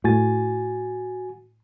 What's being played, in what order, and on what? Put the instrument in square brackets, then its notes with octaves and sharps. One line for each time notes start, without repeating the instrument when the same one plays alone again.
[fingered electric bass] A2 [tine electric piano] F#4 G#5 A6